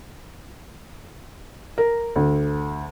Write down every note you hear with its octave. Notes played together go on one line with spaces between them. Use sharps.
A#4
D2